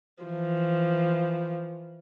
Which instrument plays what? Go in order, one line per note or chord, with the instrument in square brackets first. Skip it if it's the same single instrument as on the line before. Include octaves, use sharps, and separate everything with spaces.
[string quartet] E3 F3